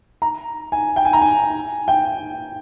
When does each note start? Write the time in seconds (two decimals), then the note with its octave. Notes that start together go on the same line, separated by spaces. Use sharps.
0.22 A#5
0.72 G#5
0.96 G5
1.05 G#5
1.13 A#5
1.22 G#5
1.88 G5